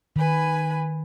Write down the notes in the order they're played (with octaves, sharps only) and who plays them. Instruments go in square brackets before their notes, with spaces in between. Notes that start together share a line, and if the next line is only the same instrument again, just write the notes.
[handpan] D#3 [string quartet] B4 G#5 B5